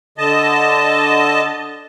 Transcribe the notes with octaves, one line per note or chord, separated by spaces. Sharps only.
D3 D#5 A5